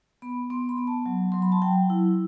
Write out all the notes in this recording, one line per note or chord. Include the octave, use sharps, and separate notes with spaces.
B3 B5
B3 C6
B5
B3
A5
F#3
F#3 C6
B5
A5
F#3 G5
E4